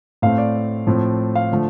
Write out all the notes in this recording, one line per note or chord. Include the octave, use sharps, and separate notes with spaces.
A2 A3 C4 F5
D5
A2 F3 C4
F5
D3 F3 A3